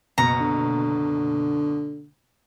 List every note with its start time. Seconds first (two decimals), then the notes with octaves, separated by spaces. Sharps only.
0.18 F#1 B2 A#5 C#7
0.41 D3